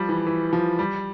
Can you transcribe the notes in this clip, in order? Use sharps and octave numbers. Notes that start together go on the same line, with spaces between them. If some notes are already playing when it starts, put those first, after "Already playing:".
Already playing: F3 G3
E3
E3
F3
G3